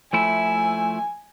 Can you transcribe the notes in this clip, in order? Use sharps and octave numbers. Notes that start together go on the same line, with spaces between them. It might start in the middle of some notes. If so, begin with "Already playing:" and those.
F3 A3 E4 G#5